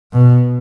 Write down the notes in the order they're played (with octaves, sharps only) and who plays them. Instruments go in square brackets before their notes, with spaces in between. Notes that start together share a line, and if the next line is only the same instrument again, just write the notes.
[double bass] B2